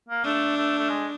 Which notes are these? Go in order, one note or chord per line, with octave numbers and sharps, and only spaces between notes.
A#3
A3 D4
A3
A3
G#3